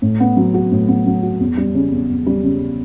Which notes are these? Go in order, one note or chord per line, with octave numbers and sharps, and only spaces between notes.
A2
B3
F#3
F#4
A2
B3
F#3
F#4
E2
G3
C#3
E2
E2
G3
C#3